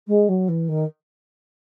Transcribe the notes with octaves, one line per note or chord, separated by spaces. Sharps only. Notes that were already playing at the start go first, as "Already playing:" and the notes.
G#3
F#3
E3
D#3